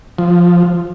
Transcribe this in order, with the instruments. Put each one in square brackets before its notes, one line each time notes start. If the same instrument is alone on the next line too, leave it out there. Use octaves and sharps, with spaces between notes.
[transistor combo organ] F3